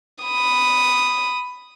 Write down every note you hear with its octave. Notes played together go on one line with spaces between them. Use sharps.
B5 D#6